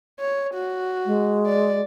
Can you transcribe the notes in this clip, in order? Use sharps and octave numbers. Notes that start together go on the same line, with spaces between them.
C#5
F#4
G#3
D5